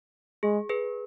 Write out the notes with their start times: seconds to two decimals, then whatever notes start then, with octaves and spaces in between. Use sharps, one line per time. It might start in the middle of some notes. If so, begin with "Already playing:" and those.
0.43 G#3 G#4
0.69 G#4 B4